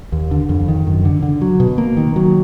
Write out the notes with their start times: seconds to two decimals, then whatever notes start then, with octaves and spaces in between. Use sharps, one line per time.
0.12 D#2
0.31 D3
0.49 F2
0.68 D#3
0.87 F#2
1.05 D3
1.23 D3
1.41 F#3
1.60 B2
1.78 A#3
1.97 D#3
2.16 F#3